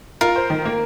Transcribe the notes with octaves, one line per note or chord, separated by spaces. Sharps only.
F4 A#4
C5
D#3
A#3